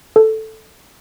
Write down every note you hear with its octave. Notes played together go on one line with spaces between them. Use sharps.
A4